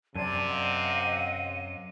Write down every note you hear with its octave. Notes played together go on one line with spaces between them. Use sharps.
F#2 C3 C4 D5 A5 G#6 D#7
D#5 F5 F#5